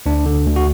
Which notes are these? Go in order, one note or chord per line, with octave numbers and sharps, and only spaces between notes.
D2 D4
D3
D2
F#4